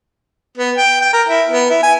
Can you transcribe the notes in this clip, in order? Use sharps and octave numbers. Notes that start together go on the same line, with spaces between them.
B3
G5
G5
A#4
E4
B3
E4
G#5